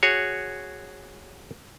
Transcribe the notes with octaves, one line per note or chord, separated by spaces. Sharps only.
F#4 G#4 C#5